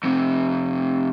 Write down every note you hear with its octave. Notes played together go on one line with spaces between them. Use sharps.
F2 C3